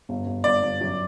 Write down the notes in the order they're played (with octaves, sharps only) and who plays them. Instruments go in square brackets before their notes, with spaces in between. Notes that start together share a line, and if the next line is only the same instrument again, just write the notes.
[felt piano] G1
G1
[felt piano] G1 [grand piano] D5
[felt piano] G1
F#2